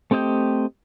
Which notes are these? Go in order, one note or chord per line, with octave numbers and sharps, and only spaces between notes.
A3 C4 G4 D#5 G6